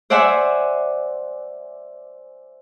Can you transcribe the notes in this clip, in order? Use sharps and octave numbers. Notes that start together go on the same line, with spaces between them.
C5 D5 E5 F#5 G#5